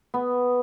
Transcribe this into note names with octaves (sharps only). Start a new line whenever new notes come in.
B3